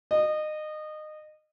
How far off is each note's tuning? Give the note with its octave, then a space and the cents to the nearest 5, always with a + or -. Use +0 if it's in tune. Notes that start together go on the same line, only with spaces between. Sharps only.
D#5 -25